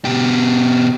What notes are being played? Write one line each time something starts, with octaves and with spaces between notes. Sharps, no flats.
B2 G4